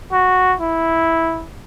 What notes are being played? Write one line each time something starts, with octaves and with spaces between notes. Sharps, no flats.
F#4
E4